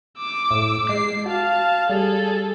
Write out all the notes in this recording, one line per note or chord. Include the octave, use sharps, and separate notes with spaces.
D6 E6
A2
G#3 C7
F#4 F5 A5
G3 G#4 A4